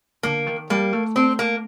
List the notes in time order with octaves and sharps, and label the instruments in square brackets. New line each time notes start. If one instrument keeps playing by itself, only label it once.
[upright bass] D3 [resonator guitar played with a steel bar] A#3
[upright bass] D#3
[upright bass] G3 [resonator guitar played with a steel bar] A#3
[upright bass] A3
[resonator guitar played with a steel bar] C4
A#3